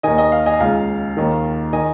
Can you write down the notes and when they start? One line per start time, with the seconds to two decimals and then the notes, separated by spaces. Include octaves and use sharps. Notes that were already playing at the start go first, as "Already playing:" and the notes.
0.03 D#2 D#3 D#5 G#5
0.18 D#5
0.32 F5
0.46 D#5 G#5
0.60 C#2 C#3 F5
1.17 D#2 D#3
1.73 D#3 D#5 G#5